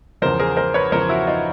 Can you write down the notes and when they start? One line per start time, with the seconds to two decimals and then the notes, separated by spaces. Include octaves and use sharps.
0.22 E2 C#3 F3 A#4 C5
0.39 G#4 A#4
0.57 A#4 C5
0.74 B4 C#5
0.92 E2 C#3 F3 A#4 C5
1.09 E4 F#4
1.27 D#4 F4